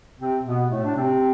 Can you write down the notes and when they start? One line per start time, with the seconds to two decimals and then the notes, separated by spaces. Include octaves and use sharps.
0.18 C3 C4
0.44 B2 B3
0.69 A2 A3
0.84 D4
0.96 C3 C4